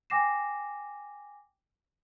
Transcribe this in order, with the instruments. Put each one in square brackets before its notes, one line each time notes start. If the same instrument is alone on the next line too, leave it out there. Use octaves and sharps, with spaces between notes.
[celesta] G5 G#5 D6 A#6 C7 E7